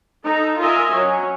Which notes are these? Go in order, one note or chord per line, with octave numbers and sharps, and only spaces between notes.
D#4 A4 A#5
F4 A#4 D#5 E5 G#5
F#3 C#4